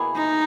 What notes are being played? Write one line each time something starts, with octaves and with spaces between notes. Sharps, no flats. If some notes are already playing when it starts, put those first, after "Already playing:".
Already playing: B2 A#3 E4 G#4
D#4